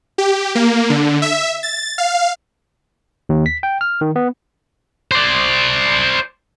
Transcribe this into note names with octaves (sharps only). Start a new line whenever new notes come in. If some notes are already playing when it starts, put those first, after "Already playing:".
G4
A#3
D3
E5
A6
F5
D#2
B6
G5
F6
D#3
B3
C5 D5